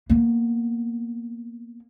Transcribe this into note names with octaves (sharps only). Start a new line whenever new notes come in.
A#3 B3